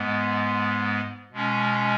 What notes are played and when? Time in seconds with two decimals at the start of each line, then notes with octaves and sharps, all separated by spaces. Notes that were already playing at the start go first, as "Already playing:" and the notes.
Already playing: G#2 G#3 B3
1.32 B2 G#3 C#4